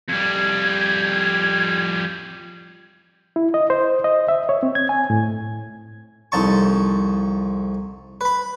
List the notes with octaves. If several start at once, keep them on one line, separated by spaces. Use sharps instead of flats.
F2 G3 G#6
E4
D#5
C5
D#5
E5
C#5
C4
G#6
G#5
A2
C2 F2 D#4 A5 C#6
B4 B5